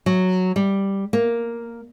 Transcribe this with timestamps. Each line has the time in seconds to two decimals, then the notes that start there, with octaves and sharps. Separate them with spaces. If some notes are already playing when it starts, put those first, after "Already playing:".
0.06 F#3
0.56 G3
1.13 A#3